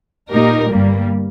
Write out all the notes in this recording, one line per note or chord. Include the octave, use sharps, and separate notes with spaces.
A#2 A#3 D#4 G4 A#4
G1 G2 G3 A#3